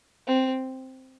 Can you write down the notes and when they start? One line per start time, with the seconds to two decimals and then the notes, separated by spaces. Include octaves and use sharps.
0.27 C4